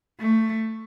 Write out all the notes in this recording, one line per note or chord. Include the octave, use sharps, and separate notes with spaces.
A3